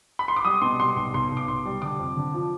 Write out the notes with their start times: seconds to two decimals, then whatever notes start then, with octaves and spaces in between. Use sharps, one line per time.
0.19 B5
0.28 C6
0.36 D6
0.45 G3 D#6
0.62 B2 C6
0.80 G3 C6
0.96 B1 C6
1.14 B1 C6
1.31 B1
1.37 D6
1.48 B1 C6
1.65 G3
1.82 D3 D6
1.99 F2
2.17 D3
2.34 F3